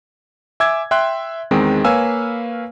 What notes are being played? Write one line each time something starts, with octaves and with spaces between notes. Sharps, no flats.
E5 G#5 D6 E6 G#6
E5 G5 C6 F#6
E2 D#3 G#3 C4
A#3 B4 C#5 F5 G#5 E6